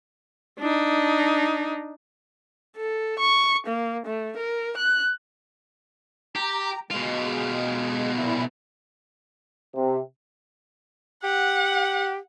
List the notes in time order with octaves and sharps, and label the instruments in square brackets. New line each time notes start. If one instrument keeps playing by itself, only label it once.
[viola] D4 D#4
[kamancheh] A4
C#6
A#3
A3
A#4
F#6
[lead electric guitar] G4 [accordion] A#5
[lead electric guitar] B2 F4 [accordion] G#3
[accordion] A#2 E4
[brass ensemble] C3
[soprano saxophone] G4 [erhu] F#5